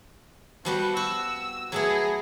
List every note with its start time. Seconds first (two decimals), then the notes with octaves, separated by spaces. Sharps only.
0.65 F3 G3 B3 F#4
0.97 F#4 E6
1.72 F#3 A3 B3 G#4